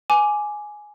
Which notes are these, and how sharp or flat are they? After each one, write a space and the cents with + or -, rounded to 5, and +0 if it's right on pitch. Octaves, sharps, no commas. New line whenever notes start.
G#5 +10 D6 +0